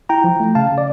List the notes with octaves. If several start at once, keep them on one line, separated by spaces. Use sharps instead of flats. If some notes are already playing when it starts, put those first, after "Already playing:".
E4 G5 A#5
F3
A3
C#3 F5 A5
C#3
D5